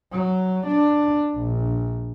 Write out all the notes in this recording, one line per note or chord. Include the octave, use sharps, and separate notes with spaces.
F#3
D4
A#1